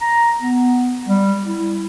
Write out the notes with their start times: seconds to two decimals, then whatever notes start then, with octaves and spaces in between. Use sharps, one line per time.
0.01 A#5
0.41 B3
1.09 G3
1.45 E4